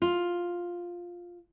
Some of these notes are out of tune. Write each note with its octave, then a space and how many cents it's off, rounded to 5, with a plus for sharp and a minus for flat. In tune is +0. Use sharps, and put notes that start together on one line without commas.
F4 +5